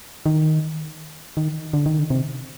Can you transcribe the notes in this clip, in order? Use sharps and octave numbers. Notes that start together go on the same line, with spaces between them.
D#3
D#3
D3
D#3
D3
C3